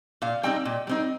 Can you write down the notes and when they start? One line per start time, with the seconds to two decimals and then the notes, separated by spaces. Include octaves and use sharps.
0.22 A#2 F5
0.43 G3 C4 D#4 G5
0.65 A#2
0.87 G3 C4 D#4